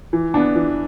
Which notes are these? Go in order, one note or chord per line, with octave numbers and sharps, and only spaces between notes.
E3
B3 D4
E3